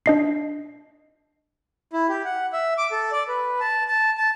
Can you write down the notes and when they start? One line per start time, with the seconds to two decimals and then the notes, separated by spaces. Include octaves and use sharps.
0.06 D4 D#5 C7
1.93 E4
2.09 G4
2.25 F#5
2.53 E5
2.78 D6
2.92 A4
3.12 D5
3.28 B4
3.60 A5
3.88 A5
4.18 A5